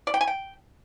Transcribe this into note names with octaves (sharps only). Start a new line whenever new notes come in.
D5
G5
G#5
G5